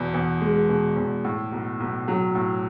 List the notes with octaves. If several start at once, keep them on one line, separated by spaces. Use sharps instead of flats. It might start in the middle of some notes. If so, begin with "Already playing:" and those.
Already playing: E2 B2
E2
G#3
B2
E2
A2
B1
B1
F#3
A2